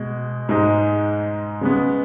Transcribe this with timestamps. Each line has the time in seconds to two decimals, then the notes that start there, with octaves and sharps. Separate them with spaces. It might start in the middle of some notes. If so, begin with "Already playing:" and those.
Already playing: B2 G#3
0.49 G#2 G#3 D#4
1.61 C#3 G#3 B3